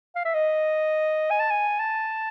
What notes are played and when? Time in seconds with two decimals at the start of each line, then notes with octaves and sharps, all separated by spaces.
0.16 F5
0.25 E5
0.34 D#5
1.31 G#5
1.40 A5
1.51 G#5
1.80 A5